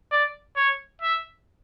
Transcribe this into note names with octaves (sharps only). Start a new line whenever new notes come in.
D5
C#5
E5